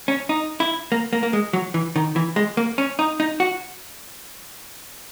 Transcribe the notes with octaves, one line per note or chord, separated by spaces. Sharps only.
C#4
D#4
E4
A#3
A#3
A#3
G#3
F#3
E3
D#3
E3
G#3
A#3
C#4
D#4
D#4
F#4